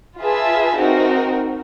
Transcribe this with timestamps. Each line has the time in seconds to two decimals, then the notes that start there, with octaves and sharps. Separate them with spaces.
0.20 F4 G#4 B4 E5 A5
0.77 C4 D#4 F#4 A#4